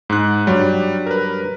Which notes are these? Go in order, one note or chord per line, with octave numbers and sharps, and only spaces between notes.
G#2 F#6
G2 F#3 G3
A#4 B4